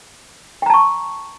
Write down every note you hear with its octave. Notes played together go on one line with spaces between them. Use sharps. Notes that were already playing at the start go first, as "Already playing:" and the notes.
G5 A5 A#5 C#6